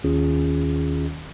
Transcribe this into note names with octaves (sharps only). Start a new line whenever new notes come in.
D#2 D#3 C#4 F4 G#4